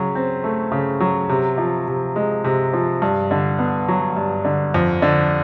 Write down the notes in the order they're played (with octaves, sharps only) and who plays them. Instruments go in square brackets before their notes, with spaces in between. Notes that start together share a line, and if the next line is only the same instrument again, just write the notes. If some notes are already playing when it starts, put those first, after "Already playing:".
Already playing: [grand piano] C#3 F#3
C4
A3
C#3
F#3
C3
F3
C3
G#3
C3
F3
G2
D3
B3
F#3
G2
D3
F2
D3